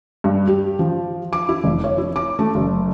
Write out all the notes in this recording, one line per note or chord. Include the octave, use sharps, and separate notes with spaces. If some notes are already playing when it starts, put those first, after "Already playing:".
G2
G4
F3
D6
E4
F1
C#5
E4
D6
A3
F#1